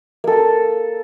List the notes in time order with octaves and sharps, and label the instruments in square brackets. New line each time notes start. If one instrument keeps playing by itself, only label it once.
[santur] A#3 A4